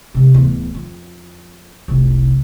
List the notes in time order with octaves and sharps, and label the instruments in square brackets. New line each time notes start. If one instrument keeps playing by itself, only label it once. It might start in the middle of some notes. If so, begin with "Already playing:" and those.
[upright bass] C3 G#3
D1 E2
F2
F1 C2